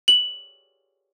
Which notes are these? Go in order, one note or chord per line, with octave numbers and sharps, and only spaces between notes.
F#7